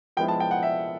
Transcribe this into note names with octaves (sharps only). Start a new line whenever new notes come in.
F3 G#3 B3 E4 G5
A5
G5
F#5
E5